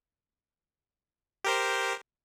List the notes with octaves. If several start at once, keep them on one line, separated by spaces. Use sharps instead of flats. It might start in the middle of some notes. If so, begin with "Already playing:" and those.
G4 A#4 C5